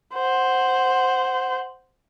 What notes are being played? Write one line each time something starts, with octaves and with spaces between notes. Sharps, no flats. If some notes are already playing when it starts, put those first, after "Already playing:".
C5 F#5